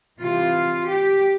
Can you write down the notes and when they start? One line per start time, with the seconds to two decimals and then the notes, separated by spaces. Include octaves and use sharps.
0.20 C3 E3 G3 C4 F4
0.88 G4